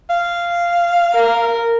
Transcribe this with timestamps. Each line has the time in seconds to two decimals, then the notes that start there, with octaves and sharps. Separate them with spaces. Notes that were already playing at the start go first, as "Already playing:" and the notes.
0.10 F5
1.14 A#4